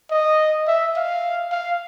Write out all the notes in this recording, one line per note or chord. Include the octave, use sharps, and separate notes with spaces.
D#5
E5
F5
F5